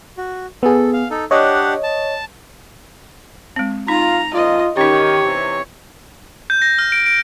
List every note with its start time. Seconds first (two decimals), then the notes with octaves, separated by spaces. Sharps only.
0.17 F#4
0.63 B3 G#4 A4
0.93 F5
1.10 D#4 A4
1.31 D4 G4 C#5 D#5 F#5
1.83 A5
3.56 G#3 C4
3.88 D#4 F4 A#5
4.34 F2 A#2 F4 D#5
4.77 D#3 C#4 D#4 G4 C#5
5.24 C3 E3
6.50 G6
6.62 A#6
6.79 F6
6.92 D7
7.06 D7